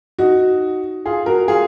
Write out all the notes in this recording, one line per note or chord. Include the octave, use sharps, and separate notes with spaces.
D#4 F#4
F4 G#4
F#4 A#4
F4 G#4